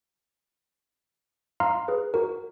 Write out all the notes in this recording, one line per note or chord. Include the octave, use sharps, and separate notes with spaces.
F5 A#5 C6 F6
G#4 B4
F#4 A#4